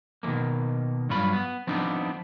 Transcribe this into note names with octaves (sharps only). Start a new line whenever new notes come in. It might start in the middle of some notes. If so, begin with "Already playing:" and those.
B2 D#3 F3 A3 A#3
G2 F#3 F4 B5
B3
F3 B3 C4 D4 D#4